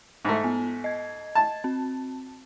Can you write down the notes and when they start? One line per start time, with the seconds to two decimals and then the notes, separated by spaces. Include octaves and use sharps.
0.25 G#2 A3
0.44 B3
0.84 D#5 G#6
1.35 A5
1.64 C4